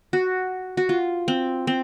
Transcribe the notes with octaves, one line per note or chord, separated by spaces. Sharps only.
F#4
F#4
F4
C4
C4